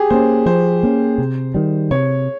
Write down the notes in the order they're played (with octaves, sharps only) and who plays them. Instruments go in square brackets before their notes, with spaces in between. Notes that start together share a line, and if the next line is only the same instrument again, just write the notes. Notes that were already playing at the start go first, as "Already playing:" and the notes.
Already playing: [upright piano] G4 G#4
[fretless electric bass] A#3 C#4 [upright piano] C5
[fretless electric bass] F3 [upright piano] C5
[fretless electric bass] A#3 C#4
C3
D#3 G3
[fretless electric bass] C3 [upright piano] C#5